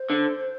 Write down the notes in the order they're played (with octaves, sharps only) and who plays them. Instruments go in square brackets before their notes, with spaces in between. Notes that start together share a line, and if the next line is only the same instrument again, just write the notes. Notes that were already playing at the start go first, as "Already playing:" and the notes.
Already playing: [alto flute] C5
[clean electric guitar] D3